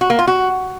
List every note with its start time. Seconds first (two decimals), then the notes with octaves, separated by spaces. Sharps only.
0.01 F#4
0.10 A#3
0.19 F4
0.27 F#4